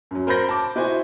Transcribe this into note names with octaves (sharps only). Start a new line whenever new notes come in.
F#2 F#3
A#4 C5 B5 G6 A#6
A5 D6
E4 F#4 C5 G#5